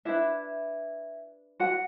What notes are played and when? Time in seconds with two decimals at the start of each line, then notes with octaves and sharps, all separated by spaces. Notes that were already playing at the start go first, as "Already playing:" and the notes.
0.05 D4 E4 B4 E5
1.60 F#4 F#5